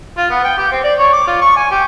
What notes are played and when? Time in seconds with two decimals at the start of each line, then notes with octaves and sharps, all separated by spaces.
0.18 F4
0.30 B3
0.44 G5
0.58 G4
0.72 C4
0.84 D5
0.99 C#5
1.13 D6
1.27 F4
1.41 C#6
1.56 G#5
1.71 G4